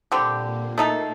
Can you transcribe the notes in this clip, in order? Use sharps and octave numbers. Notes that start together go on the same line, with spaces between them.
A#2 D3 G3 A#3 C4 G4
A#2 A3 A#3 D#4 A4